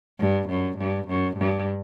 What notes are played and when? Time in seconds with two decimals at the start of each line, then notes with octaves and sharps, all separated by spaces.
0.20 G2
0.49 F#2
0.78 G2
1.08 F#2
1.37 G2